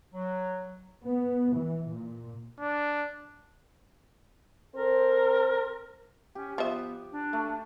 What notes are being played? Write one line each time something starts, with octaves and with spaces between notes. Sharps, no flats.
F#3
B3
E3
A#2
D4
C4 A4 A#4 C5
C#4 G4
F3 B3 E5
D4
A3